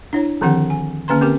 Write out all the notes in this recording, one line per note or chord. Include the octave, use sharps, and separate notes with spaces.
D4 E4 C#5
D3 D#3 F3 C4 G4 F#5
G#5
D3 A#3 C#4 B4 A#5 C6
C4 C#4 G4 A#4